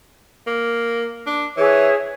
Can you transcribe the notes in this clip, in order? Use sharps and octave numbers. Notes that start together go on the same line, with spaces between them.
A#3
D4
E3 G#4 C#5 E5